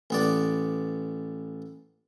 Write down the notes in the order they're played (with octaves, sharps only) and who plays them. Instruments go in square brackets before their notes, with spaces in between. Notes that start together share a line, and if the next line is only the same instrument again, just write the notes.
[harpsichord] A1 B3 D5